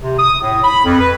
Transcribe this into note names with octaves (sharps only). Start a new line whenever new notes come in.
C3
D#6
A2
B5
F2
B4